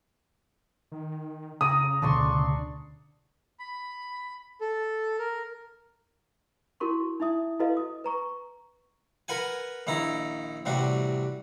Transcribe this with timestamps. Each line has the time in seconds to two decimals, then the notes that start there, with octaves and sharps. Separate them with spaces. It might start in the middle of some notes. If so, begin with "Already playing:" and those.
0.92 D#3
1.61 C#3 A#5 D#6
2.02 D2 B2 D3 D4 C6 C#6
3.60 B5
4.61 A4
5.19 A#4
6.80 E4 F#4 A#4 C6 C#6
7.20 D#4 E4 E5 D#6
7.60 E4 F#4 A4 B4 D#5 F5
7.77 D#6
8.04 B4 A#5 C#6
9.28 A#4 B4 F#5 G#5
9.87 A#1 D#3 E4 A#5
10.65 A1 C3 G3 F#4